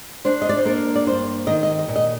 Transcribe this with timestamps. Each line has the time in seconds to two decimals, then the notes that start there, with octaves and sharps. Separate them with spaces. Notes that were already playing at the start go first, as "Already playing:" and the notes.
0.25 D4 C5
0.42 D#5
0.49 D5
0.58 C5
0.65 A#3 A#4
0.96 D5
1.06 G2 C5
1.47 D#3 D#5
1.63 D#5
1.79 D#5
1.88 A#2
1.96 D#5